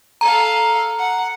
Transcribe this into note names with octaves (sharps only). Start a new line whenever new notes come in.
A4 F5 A#5
F#5